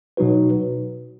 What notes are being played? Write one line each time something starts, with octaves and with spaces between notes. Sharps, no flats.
B2 F#3 D#4 F#4 B4